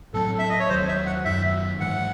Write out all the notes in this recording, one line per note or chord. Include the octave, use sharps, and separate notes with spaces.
A2 F#3 C4 A4
E5
D#5
C#5
D#2 D#3 F#3 C5
E5
F#5
F#2 D#3 F#3 E5
G#2 E3 G#3 F#5